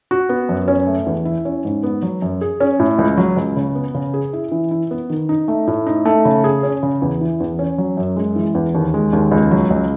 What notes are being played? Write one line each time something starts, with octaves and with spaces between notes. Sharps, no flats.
F#4
B3
F#2
C#4
A3
E2
E4
C#4
G#2
B3
F#3
F#2
G#4
C#4
A2
C#2
F#3
C#2
C#3
B3
C#3
G#4
E4
E3
E4
B3
D#3
D#4
A3
A2
D#4
A3
C#3
G#4
C#4
C#3
E2
E3
E2
C#4
F#3
F#2
G#3
E3
E2
D#2
G#3
D#2
C#2
F#3
C#2